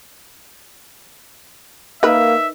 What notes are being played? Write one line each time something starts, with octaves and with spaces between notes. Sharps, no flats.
A#3 D#4 A#4 B4 E5